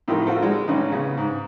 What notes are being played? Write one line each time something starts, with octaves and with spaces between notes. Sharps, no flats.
A2 F3 C4 D#4 G4 A#4
F4 F#4 A4 C5
G3 G#3 D#4 F4
A1 C#4 D#4
C#3 B3
G#2